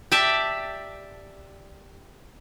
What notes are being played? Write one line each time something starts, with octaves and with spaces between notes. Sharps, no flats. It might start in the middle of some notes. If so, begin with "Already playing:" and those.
G4 D5 E5 A5